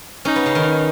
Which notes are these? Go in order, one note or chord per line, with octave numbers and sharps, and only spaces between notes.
C#4 D#4
B3
C#3
D#3